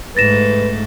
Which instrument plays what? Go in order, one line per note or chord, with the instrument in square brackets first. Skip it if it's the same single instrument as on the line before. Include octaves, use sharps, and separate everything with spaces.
[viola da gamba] G#2 A3 [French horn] B4 [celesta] A6 A#6 E7